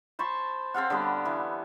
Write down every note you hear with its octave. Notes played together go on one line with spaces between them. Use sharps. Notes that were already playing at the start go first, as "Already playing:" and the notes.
C5 A5 B5 C#6
C4 A4 F5 F#5
D3 G3 B3
E3